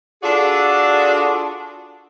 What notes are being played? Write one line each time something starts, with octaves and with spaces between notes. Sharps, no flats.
D4 F4 F#4 G#4 A4 D5